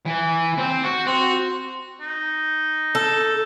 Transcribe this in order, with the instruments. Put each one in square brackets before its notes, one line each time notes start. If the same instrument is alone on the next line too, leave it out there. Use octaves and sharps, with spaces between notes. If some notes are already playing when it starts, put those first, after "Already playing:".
[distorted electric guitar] E3
C4
F#4
[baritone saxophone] C4 [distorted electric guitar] F#4
[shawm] D#4
[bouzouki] A4